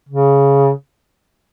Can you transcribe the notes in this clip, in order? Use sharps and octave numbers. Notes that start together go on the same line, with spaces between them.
C#3